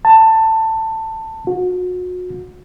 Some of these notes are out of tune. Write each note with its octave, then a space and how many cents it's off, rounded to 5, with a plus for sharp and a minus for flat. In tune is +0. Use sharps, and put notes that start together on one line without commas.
A5 +15
F#4 -35